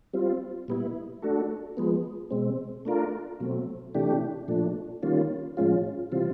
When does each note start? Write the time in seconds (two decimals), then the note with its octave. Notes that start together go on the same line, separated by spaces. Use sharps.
0.13 G3 C4 F4
0.68 A#2 G3 B3 E4
1.22 A3 D4 F#4 A4
1.77 F3 G#3 B3
2.31 B2 G#3 C4
2.85 A3 D4 F4 A#4
3.40 B2 F#3 A3 C4
3.95 C3 E3 A3 D4 G4
4.48 A#2 F3 A3 D4
5.03 D#3 G3 A#3 C#4 F4
5.57 A2 F3 G#3 C#4 F4
6.12 C3 E3 G3 C4 F4